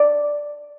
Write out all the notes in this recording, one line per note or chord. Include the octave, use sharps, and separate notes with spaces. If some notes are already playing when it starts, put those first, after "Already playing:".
Already playing: D5